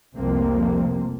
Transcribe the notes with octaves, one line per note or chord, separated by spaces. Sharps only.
F1 C2 F2 C3 A#3 C4